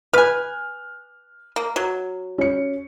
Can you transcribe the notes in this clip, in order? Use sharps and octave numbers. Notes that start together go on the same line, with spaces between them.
B4 G#5 F6 F#6
A#3
F#3
C#4 C#7